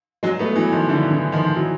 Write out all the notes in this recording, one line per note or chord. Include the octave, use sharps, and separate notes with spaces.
F#3 G#3
A3 B3
E3 F#3
D#3 F3
D3 E3
D3 E3
D#3 F3
E3 F#3